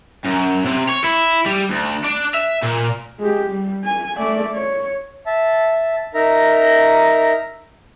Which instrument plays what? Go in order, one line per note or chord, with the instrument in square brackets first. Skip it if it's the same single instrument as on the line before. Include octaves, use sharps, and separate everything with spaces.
[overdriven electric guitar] F#2
C3
C#5
E4
G3
D2
D4
E5
A#2
[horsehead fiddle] G#3 G4
G3
G#5
A3 D5
C#5
[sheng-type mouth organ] E5 A5
D#4 A#4 E5 A#5